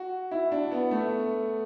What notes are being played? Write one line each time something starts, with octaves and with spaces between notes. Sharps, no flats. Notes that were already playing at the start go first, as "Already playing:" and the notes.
Already playing: F#4
E4
D4
B3
A3